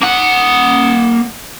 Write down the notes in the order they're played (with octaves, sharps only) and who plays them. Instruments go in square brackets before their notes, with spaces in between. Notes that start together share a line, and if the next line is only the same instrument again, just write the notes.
[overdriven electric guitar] A#3 F#5